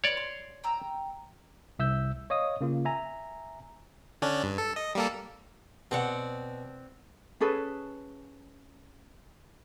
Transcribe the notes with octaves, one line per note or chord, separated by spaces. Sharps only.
F4 G4 B4 C#5 D5
C6
G5 A#5 E6
C2 E5 E6 G6
C#5 D#5 F5 D#6
C#3 A#3 F4
E5 G#5 A#5
D3 C#4 D4
G2
A4
D#5
G3 A#3 A4
B2 C4 D5 F#5
C#4 G#4 A4 B4